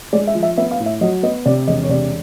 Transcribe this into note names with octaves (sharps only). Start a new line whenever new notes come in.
G#3 D5
E5
F3
E5
B3 E5
F5
A2
E5
F#3 D#5
B3 D#5
C3 D5
E1 D#5
C#5
C3 D5